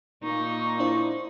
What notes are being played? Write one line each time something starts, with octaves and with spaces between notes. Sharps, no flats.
A#2 A#3 D#4 C#6
D4 E4 C5